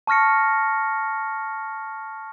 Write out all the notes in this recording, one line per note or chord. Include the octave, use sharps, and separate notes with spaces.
A5 C#6 F6 A#6 C#7